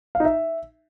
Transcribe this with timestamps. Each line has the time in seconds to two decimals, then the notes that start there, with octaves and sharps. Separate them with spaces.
0.15 F5
0.20 D#4
0.25 E5